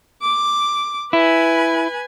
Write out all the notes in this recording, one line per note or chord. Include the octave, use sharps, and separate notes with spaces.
D6
E4 B4 G#5